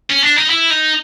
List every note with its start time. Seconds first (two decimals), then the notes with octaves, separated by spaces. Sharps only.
0.10 C#4
0.22 D4
0.36 D#4
0.49 E4
0.70 D#4